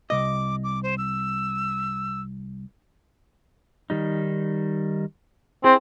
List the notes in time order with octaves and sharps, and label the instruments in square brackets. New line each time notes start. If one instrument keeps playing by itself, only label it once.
[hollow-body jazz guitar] C2 D#5 [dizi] D6
[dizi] D6
C5
E6
[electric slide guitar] D#3 G3 D#4
[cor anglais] C4 [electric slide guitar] E4 G#4